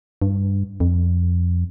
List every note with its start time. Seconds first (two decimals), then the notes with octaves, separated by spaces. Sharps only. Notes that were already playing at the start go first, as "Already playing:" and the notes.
0.22 G2
0.80 F2